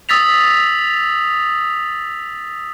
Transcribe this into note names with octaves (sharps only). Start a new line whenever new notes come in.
D#6 E6 A6 B6 F7